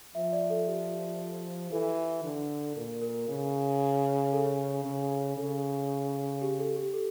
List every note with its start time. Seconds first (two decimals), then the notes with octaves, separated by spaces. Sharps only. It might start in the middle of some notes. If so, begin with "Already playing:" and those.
0.15 F3 E5
0.32 D5
0.50 A4
0.67 G4
1.71 E3 A4
2.24 D3
2.76 A#2 A#4
3.02 A#4
3.28 C#3
4.33 A4
4.85 C#3
5.37 C#3 A4
6.42 G4
6.59 A4
6.76 G4
6.93 A4